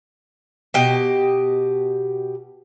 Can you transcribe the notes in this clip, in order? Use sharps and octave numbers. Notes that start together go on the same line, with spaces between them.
B2 G4 D#5